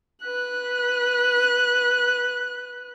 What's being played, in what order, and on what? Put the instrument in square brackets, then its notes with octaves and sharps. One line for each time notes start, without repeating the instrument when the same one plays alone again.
[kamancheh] B4 F#6